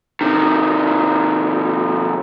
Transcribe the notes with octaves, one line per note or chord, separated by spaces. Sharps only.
C3 D#3